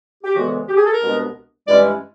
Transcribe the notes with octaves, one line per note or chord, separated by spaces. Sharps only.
G4
D2 C#3 E3 G#3 B3 F#4
G4
G#4
A4
A#4
C2 B2 G#3 B3 D4
G2 E3 G#3 C#4 E4 D5